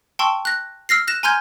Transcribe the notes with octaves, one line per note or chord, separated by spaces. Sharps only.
G5 A5 C6 C#6 E6
F#6 A#6
E6 F6 A#6 C7
F#6 A#6 E7
G#5 A#5 C6 F6 G6 G#6